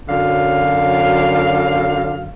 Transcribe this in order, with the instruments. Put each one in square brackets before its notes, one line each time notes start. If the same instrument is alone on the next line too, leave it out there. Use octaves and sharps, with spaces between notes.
[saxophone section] F#2 D3 F#3 F5